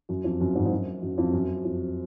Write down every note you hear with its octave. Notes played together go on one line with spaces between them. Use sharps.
F#2
F2
F#2
G#2
G#2
F#2
F#2
F2
F#2
F2